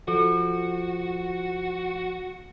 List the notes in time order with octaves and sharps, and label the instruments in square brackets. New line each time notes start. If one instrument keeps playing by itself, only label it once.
[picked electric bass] F3 [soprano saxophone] F#4 [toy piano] A4